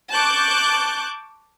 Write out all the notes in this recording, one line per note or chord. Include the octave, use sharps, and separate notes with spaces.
A5 C#6 D6 F#6 G6